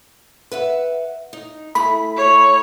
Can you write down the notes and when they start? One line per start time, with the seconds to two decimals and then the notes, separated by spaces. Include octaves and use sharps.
0.52 B4 E5 F#5
1.33 D#4
1.75 A3 E4 G#4 B5
2.16 C#5